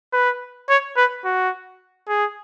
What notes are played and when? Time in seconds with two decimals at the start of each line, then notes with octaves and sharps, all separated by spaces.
0.13 B4
0.69 C#5
0.97 B4
1.25 F#4
2.09 G#4